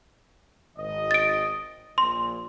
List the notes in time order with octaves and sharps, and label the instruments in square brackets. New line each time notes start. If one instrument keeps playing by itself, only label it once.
[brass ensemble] G#1 D#5
[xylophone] A6 D7
[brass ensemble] A#1 A#2 [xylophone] C6